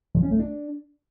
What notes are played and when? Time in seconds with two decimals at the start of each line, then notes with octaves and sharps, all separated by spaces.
0.15 F3
0.23 C#4
0.31 A3
0.39 D4